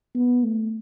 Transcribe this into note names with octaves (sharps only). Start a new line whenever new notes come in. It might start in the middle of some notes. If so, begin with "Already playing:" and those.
B3
A3